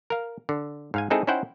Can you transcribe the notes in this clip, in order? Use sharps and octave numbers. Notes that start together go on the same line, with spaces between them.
A#4 F5
D3
G#2 F5 G#5
G#3 C4 D#4 E4 G#4 A4
C#4 D#4 E4 C5 F#5 G5